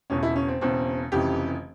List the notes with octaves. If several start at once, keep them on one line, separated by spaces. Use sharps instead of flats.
E1 E2 C#3 C#4
E4
C#4
C4
E1 E2 C#3 C4
F1 F2 C#3 E3 G4